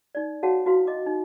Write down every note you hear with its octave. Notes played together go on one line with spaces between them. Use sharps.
D#4 D5
F#4 G#4 C#5 F5 F#5 A5
E4 F#4 B4 F5 C6
D#5 D6
D#4